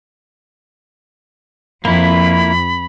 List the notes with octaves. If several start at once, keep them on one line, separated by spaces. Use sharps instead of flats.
F2 A#3 E4 B5